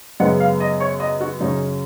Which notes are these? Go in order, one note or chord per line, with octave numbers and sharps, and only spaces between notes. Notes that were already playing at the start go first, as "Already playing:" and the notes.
F#2 C#3 G#3 B3 F#5
F5
D#5
C#5
D#5
F#4
F#2 C#3 F#3 C#4 D#4